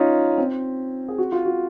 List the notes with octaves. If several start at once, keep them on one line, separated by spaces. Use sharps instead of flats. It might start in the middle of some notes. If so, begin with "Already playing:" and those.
Already playing: C#4 D#4 F4
C4
G#4
F#4
F4
F#4